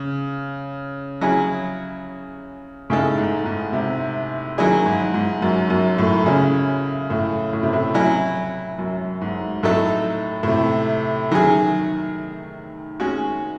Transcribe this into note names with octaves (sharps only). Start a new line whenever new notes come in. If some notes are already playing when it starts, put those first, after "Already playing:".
Already playing: C#3
F#3 C#4 E4 G#4
A2 C#3 G#3 D#4 A4
G#2
G#2
C3
D#3 F#3 C#4 E4 G#4
G#2
G#2
F#2
F#2
A2
C#3 G#3 C#4 E4
A2
A2
C3
A2
F#3 C#4 E4
F#2
G#2
A2 F#3 A3 D#4 A4
A2
C3
D#3 F#3 C#4 G#4
G#3 C#4 F#4